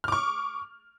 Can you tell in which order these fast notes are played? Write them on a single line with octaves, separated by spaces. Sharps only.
F6 D6 C#6